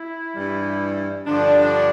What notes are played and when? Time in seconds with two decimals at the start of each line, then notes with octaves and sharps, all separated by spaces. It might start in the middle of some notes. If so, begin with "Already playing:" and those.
Already playing: E4
0.36 G2 E3 G3
1.26 G2 D3 F3 D4